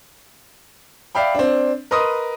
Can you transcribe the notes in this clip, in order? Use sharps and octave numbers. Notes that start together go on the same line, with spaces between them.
D5 E5 F5 G5 B5
C4 D4
A#4 B4 D#5 C6 D#6